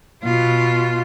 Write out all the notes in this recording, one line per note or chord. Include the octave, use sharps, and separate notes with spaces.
B2 F4